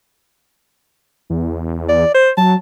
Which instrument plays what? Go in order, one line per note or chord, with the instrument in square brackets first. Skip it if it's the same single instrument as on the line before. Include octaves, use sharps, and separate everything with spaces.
[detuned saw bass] E2
[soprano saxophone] D5
C5
[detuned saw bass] F#3 [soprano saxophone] A5